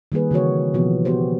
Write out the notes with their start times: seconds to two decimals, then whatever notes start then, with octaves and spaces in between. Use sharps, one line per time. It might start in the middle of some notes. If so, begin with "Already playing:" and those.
0.12 D#3 G3 A#3 G#4 B4
0.31 C#3 E3 C4 F#4 C#5
0.74 B2 E3 F3 B3 F#4
1.05 B3 F#4 G4 C5